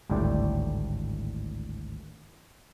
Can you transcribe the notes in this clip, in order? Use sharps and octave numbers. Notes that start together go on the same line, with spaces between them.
G#1 D2 A2 G3 D5 G5